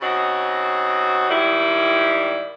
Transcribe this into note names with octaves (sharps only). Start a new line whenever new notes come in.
C#3 C4 D#4 F#4
G#2 D#3 G3 E4